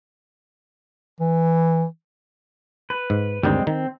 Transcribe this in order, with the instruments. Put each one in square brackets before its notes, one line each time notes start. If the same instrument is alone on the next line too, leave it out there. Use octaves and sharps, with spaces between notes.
[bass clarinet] E3
[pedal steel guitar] B4
[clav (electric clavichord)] G#2
[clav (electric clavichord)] D2 G2 D#3 [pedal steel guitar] G3 G#3 C4
[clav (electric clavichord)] D#3 [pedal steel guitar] C4